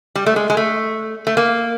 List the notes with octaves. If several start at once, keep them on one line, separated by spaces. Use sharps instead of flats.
G3
A3
G#3
G#3
A3
A3
A#3